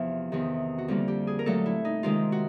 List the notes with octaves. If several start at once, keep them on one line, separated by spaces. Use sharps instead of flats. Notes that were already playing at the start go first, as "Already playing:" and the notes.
Already playing: E2 C3 F3 E4
E2 C3 D#3
F#4
F2 D3 G3 A#3 F4
G4
G#4
A#4
A#2 F#3 A3 A4
E4
D#4
C3 D#3 G#3 F4
F#4